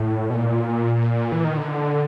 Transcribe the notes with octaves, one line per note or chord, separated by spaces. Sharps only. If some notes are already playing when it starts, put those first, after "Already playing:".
Already playing: A2
B2
A#2
E3
D#3
D3